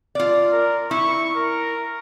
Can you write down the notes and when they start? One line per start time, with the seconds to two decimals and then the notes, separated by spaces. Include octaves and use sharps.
0.15 F4 D5
0.52 A#4
0.91 E4 C#6
1.36 A#4